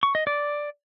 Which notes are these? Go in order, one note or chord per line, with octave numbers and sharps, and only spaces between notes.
C#6
D#5
D5